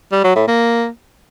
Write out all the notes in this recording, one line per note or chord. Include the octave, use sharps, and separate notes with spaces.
G3
F#3
A2
A#3